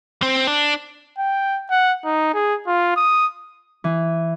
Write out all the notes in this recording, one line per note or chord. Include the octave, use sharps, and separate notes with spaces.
C4
D4
G5
F#5
D#4
G#4
F4
D#6
E3